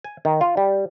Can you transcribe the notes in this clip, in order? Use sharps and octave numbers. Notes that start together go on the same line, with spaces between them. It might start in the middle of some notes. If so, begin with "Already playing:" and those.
G#5
D#3
F4
G3